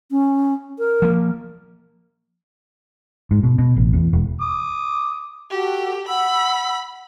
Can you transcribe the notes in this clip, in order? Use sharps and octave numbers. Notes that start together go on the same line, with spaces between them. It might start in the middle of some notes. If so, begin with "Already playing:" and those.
C#4
A#4
F3 A#3
G#2
B2
B2
A1
E2
E1
D6 D#6
F#4 G4 A4 G5
F#5 B5 E6